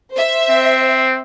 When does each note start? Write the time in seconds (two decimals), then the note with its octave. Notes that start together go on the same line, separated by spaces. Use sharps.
0.13 C5 E5
0.49 C4